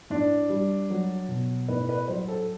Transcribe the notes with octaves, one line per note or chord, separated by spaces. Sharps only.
A2 D4
G3
F#3
B2
A2 B4
B4
F#3 C5
A4